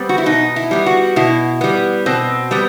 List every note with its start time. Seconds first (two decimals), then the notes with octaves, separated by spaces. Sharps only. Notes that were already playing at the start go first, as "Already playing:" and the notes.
Already playing: G3 B3 C4
0.09 F#4
0.18 E4
0.26 B2 D#4
0.56 E4
0.71 G3 B3
0.86 F#4
1.16 B2 E4
1.61 G3 B3
2.06 B2 C4
2.51 G3 B3